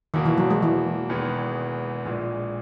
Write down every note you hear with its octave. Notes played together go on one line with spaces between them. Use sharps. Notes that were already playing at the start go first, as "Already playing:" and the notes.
E2 B2 D#3 A#3
E3
F#3
G#3
E3
E1 E2 D#3 G#3 B3
A#1 A#2 G#3